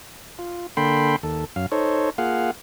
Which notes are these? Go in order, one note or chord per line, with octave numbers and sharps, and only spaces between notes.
F4
D3 A#3 A4 G5 B5 C6
D#2 A4
F#2 F5
D#4 A4 C5 C#5
A#3 F4 G#4 F5 F#5